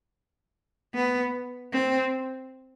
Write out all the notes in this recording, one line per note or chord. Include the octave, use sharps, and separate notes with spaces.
B3
C4